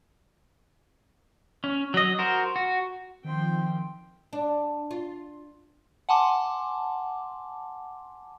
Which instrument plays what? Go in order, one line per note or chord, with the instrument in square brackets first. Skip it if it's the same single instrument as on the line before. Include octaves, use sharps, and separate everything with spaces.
[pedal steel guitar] C#4
F#3 D#5
F#4 A#4 C5
F#4
[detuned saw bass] D#3 [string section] F3 [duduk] C4 [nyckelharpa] G5 C6
[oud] D4
F4
[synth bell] F#5 G#5 A5 C6 D6